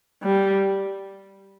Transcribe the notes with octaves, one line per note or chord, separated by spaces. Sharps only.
G3